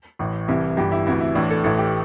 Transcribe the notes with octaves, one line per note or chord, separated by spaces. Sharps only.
A1 A2 E3
C2 C3 E3 E4
G1 G2 E3 G4
E4
D2 C3 E3 E4
E4
A1 A2 E3 D4
A4
A1 A2 E3 A4
G4